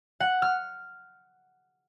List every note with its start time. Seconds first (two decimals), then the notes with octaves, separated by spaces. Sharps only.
0.20 F#5
0.42 F6